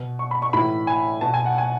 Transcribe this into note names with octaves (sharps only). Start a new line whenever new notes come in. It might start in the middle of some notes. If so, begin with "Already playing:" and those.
Already playing: B2
C#6
B5
C#6
A2 E3 B5
G#5
B2 A5
G#5
F#5
G#5